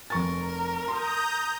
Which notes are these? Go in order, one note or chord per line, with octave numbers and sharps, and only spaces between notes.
F1 A#4 C#6 A6
A#5 C6 D#6 G6